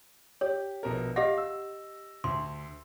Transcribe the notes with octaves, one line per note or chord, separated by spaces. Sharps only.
G4 C#5
A#1 B2 A#4
G4 D#5 F5 F#5 D6 A#6
E6
D2 C6